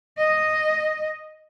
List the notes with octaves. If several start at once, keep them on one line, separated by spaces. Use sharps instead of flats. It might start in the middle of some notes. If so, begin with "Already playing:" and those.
D#5